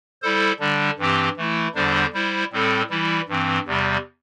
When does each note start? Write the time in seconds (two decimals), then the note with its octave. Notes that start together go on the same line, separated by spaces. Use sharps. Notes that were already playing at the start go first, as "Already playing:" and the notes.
0.22 G3 E4 A4 C5
0.59 D3 G3 D4
0.98 G2 E3 C4 G4
1.37 E3 A3 E4
1.75 E2 D3 G3 D4 C5
2.13 G3 E4 C5
2.52 A2 G3 C4 A4
2.90 E3 G3 E4
3.29 G2 E3 C4
3.66 E2 C3 G3